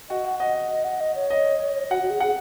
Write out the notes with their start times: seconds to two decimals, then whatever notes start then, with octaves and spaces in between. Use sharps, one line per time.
0.10 F#4 D#5
0.25 F#5
0.40 D#5 F#5
0.70 D#5
0.84 F#5
1.00 D#5
1.15 C#5
1.30 D#5
1.90 F#4 F#5
2.02 F#4
2.10 G#4
2.20 G#4 F#5